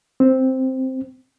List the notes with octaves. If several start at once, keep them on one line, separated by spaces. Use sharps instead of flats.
C4